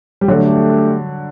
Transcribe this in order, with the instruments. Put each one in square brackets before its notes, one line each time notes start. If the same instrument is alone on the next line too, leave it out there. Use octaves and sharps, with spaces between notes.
[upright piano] G3
[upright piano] D3 F#3 [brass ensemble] A3 D4 G4